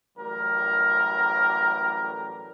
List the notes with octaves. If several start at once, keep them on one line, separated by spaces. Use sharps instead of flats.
A1 F#3 G3 A#4